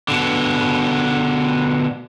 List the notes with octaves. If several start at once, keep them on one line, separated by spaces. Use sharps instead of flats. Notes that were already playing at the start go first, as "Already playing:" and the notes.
B2 D3